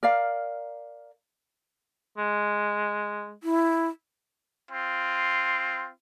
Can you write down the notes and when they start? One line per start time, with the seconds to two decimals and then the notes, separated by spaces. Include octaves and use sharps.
0.03 A#4 D5 F5
2.18 G#3
3.43 E4
4.71 C4 F4